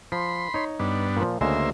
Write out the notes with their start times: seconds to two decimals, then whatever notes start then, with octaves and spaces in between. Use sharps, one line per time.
0.12 F3 B5 C6
0.54 D#4 C#5
0.80 G2 B3 D4
1.17 A#2 F3
1.41 D2 C#3 G#3 A#3 C5 E5